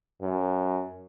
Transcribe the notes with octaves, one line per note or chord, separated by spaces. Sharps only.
F#2